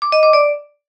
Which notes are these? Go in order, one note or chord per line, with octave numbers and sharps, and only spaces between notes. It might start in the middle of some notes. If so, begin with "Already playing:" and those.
D6
D#5
D6
D5